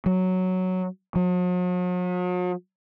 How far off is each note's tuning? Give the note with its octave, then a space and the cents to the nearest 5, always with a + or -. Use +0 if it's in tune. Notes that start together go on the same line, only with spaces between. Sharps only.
F#3 +0
F#3 -45